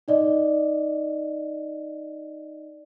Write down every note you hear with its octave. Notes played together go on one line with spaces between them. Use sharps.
D#4 D5 D#5